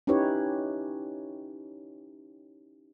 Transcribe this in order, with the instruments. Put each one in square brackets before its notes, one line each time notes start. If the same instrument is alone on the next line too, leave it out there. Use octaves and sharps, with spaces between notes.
[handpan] C#4 D#4 E4 G4 B4 C#5